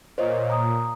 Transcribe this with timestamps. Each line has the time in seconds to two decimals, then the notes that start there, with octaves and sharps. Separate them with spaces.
0.18 A#2 C5 C#5 D#5
0.50 A#5 D#6